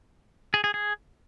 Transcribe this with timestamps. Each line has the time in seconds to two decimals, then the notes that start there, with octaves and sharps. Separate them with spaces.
0.54 G#4
0.64 G#4
0.74 G#4